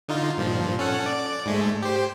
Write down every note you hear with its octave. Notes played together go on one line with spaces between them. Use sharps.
D3 D#4 F4
G2 A#2 F3
C#4 A4 F#5
D5
G#2 G#3 A3
G4 C5